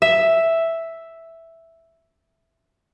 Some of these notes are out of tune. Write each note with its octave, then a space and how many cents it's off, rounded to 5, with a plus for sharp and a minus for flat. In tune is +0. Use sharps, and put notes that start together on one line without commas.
E5 +0